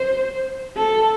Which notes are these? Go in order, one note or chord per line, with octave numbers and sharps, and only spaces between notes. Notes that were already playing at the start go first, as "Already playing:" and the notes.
Already playing: C5
A4